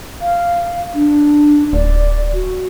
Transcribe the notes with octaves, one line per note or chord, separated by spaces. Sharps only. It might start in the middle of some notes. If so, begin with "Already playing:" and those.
F5
D4
D1 D5
F#4